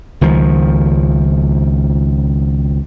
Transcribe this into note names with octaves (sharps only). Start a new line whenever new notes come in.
C#2 D#3 F3